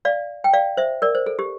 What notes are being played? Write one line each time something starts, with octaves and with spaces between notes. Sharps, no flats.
D5 F5
G5
D5 F5
C5 E5
A#4 D5
C5
A4
G4